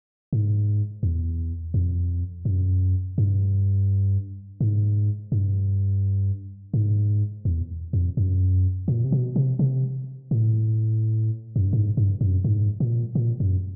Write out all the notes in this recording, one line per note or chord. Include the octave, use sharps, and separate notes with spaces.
G#2
E2
F2
F#2
G2
G#2
G2
G#2
E2
F2
F#2
A#2
C3
B2
C3
C3
A2
F#2
G2
G#2
G2
F#2
G#2
A#2
A#2
F#2